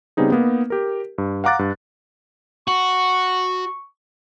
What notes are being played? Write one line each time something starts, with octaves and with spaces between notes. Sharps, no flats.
C#3 G3 B3 C4 D#4 G#4
A#3 B3 D#4
G4 A#4
G2
F5 F#5 A#5 D6 F#6 A6
G2
F#4 C#6